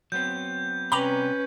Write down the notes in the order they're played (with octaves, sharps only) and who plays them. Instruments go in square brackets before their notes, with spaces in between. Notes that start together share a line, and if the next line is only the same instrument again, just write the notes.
[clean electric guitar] F#3 B3 C4 [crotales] G6
[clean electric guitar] C3 G3 G5 [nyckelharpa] C#4 B4 [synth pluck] A#5 B5 D6